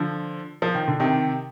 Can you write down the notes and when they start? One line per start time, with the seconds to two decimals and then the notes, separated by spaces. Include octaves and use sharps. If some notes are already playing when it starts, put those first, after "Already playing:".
Already playing: D3 F3
0.62 F3
0.74 D#3
0.88 D3
1.00 C3 D#3